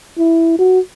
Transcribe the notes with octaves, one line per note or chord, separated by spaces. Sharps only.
E4
F#4